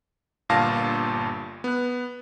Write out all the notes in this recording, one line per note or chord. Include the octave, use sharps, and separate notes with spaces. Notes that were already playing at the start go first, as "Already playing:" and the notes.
G1 G2 A#2 F5 A5 A#6
B3 F#6